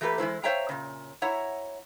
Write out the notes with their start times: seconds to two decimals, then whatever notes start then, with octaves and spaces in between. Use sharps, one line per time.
0.01 E3 A3 A#3 G4 B4
0.18 E3 G#3 E4 C5
0.43 C5 C#5 E5 F5 G5 A#5
0.69 A#2 C#3
1.22 E4 C#5 E5 F#5 A#5